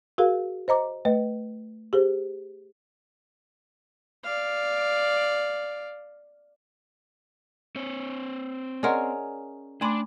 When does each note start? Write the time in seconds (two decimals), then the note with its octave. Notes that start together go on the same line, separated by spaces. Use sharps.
0.18 F#4 G#4 A#4 F5
0.68 C5 D#5 A#5 D6
1.05 A3 B4 D#5
1.93 G4 G#4 C5
4.24 D5 F5
7.76 C4 C#5
8.83 C#4 G#4 A#4 D5 D#5 F#5 G#5 C6
9.81 A3 D4 G#5 B5 C6 D6